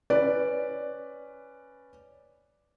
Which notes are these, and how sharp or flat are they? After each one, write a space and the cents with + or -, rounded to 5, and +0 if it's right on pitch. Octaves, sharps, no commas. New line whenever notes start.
C#4 -5 B4 +0 D5 +0